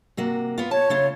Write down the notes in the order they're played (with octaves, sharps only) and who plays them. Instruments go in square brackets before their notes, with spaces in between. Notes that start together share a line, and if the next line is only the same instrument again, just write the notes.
[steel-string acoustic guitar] C3 A#3 F#4
B3 F4
[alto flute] C#5 [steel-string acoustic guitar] A5
[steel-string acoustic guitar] C#3 A3 F4